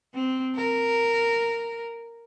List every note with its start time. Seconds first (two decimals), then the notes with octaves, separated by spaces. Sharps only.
0.14 C4
0.56 A#4